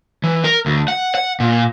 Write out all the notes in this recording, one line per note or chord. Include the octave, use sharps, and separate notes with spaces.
E3
A#4
D2
F#5
F#5
A#2